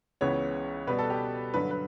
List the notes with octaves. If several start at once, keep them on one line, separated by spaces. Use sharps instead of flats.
C#2 C#3 E3 B3 C#5
B2 G3 B3 B4
A4
G4
G2 D3 F#3 B4
B4